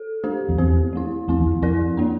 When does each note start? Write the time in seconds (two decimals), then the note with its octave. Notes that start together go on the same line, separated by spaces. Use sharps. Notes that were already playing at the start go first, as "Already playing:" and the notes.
Already playing: A4
0.24 A3 D4 G4 C5
0.49 F2
0.58 E2 C4 G4 C5
0.93 F3 A3 E4
1.28 F2 A3 C4 E4
1.40 E2
1.51 F2
1.62 F2 C4 E4 A#4 D5
1.97 F3 A#3 D4